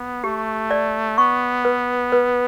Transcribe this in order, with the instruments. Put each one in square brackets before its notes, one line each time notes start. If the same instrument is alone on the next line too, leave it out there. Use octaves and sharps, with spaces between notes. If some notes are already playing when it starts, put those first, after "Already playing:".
Already playing: [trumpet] B3
[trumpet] A3 [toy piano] G4
[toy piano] D5
[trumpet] B3 [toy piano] C#6
[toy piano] B4
B4